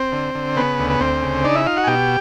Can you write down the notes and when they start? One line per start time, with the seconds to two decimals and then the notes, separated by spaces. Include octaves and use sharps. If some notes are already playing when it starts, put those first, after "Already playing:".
Already playing: C4 C5
0.12 D3
0.35 D3
0.56 C#3 B3 B4
0.79 D2
0.90 B4
1.00 D2 C4 C5
1.22 C#3
1.44 D4 D#4 D5
1.55 E4 E5
1.66 D#4 F4 F5
1.77 F#4 F#5
1.84 G#5
1.87 B2 G4 G5